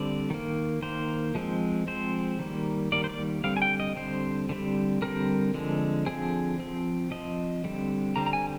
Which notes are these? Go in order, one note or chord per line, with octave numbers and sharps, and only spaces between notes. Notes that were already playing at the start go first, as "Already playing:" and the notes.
Already playing: D3 G3 C4 D5
D#3 A#3
D#3 A#3 C5
F3 G#3 C4
F3 G#3 C4 C5
D#3 G3 A#3
D#3 G3 A#3 D5
C5
D5
D3 G3 C4 F5
G#5
G5
D#5
D3 G3 C4 C5
D3 G3 C4
D3 G3 C4 A#4
D3 F3 G#3 C4
D3 F3 G#3 C4 G#4
F3 C4
F3 C4 D#5
D3 G3 C4
D3 G3 C4 A#5
A#5
G#5